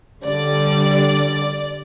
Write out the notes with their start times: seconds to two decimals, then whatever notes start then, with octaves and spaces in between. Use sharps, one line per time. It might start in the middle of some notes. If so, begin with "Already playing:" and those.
0.25 D3 G3 D5